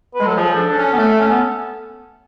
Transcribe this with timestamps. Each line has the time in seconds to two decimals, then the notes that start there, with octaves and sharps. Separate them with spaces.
0.15 B4
0.20 G#3
0.26 F#3 A4
0.36 F3 G#4
0.48 A4
0.56 D4
0.78 C#4
0.93 B3
0.98 A3
1.20 C#4
1.29 B3